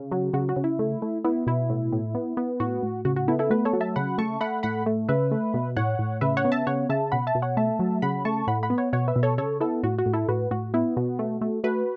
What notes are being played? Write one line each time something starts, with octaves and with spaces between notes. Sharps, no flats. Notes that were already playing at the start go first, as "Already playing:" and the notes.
Already playing: C#3
F#3 F#4
C#3 F#4
F#4
C#3
E4
A3
A3
B3 E4
B2 E4
A2
A2
B3
B3
A2 F#4
A2
C#3 F#4
F#4
B3 E4 A4
E4 A4
A3 F#4 B4
A4 C#5
F#3
E5 A5
C#3 F#5 B5
A3 A5 C#6
A3 F#5 B5
A2 F#5 B5
A3
C#3 B4 E5
A3
B2
A2 C#5 F#5
A2
C#3 B4 E5
C#5 F#5
B3
E5 A5
C#3 C#5 F#5
C#3 E5 A5
B2 F#5 B5
E5 A5
B2
C#5 F#5
A3 E5 A5
F#3
C#3 F#5 B5
A3 A5 C#6
A2 F#5 B5
F#5 B5
B3
C#5 F#5
B2 C#5 F#5
B4 E5
B2
A4 C#5
C#3 A4 C#5
B3 E4 A4
A2 F#4
F#4
A2
E4 A4
A2 F#4 B4
A2 F#4
B3 E4
B2 F#4
A3
A3
A3 F#4 B4